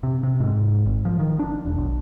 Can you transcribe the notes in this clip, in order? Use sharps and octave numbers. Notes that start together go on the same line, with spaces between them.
C3
C3
G#2
G#1
F3
D#3
D4
E1
B1